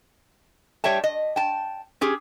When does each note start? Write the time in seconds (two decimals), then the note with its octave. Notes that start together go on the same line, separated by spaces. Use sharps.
0.84 G3 C#5 E5 G5 A5
1.04 D#5
1.36 G5 A5
2.01 C#4 G4 G#4